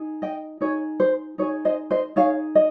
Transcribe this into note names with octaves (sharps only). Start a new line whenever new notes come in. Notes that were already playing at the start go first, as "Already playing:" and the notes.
Already playing: D#4 G#4
D#5 G5
D#4 G#4 C#5
C5
D#4 G#4 C#5
C5 D#5
C5 D#5
D#4 G#4 C#5 F5
D#5